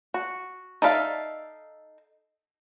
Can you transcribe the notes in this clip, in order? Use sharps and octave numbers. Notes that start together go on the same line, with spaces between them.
F#4
D#4 A4 D5 E5 F5